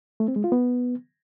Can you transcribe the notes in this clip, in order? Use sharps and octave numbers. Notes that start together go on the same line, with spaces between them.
A3
C4
G#3
F4
B3